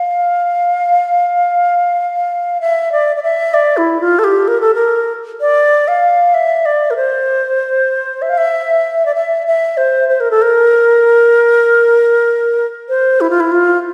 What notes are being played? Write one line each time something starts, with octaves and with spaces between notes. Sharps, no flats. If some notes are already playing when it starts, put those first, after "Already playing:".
Already playing: F5
E5
D5
D5
E5
D5
E4
F4
A4
G4
A#4
A4
A#4
D5
F5
E5
D5
A#4
C5
E5
F5
E5
D5
E5
E5
C5
C5
A#4
A4
A#4
C5
E4
F4
E4
F4